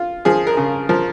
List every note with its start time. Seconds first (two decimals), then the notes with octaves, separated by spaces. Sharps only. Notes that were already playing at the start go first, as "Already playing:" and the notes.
Already playing: F4
0.25 F3 G#4
0.47 A#4
0.57 C#3
0.89 F3 A#4